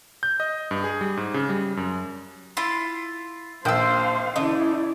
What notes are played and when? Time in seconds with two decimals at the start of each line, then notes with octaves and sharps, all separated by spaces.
0.23 G6
0.40 D#5
0.71 G2
0.84 G#4
1.01 G3
1.17 G#2
1.34 C#3
1.49 G3
1.77 F#2
2.57 E4 F4 C6
3.65 A#1 C5 F5 G5 E6 G6
4.36 C#3 A3 E4 D5 D#5